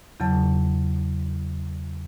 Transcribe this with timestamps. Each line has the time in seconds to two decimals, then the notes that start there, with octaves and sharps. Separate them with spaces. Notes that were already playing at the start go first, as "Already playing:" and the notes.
0.20 E2 C#3 F#3 A5